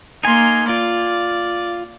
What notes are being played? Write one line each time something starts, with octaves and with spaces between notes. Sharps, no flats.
A#3 D#4 G#5 C6
F4 D5